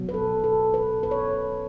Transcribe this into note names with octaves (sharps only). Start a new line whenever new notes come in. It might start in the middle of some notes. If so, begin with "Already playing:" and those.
Already playing: B2 F#3 B3
B4
A4
A4
B4
B4
C#5